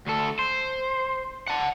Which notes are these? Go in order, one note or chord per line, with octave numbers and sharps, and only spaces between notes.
D2 A4
C5
F#5 A5